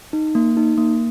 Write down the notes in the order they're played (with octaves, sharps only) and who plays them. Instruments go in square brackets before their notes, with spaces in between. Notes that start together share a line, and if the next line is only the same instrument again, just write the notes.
[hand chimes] D#4
A#3
D#4
A#3